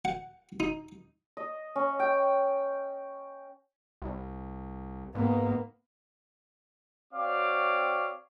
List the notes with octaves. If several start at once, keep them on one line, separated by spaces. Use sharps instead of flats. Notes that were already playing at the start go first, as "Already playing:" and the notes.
F#5
D#4
D#5
C#4
G5
C2
G#2 A#3 B3
C4 F#4 C#5 D5 F5 D6